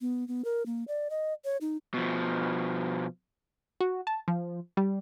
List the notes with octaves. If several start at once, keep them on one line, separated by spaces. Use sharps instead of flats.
B3
B3
A#4
A#3
D5
D#5
C#5
D#4
B2 F3
F#4
A5
F3
G3